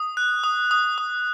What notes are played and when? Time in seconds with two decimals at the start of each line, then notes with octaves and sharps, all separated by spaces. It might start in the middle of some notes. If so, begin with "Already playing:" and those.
Already playing: D#6
0.17 F#6
0.44 D#6
0.71 D#6
0.98 D#6